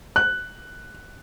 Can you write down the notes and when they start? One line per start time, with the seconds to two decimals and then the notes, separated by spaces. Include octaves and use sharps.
0.16 F#6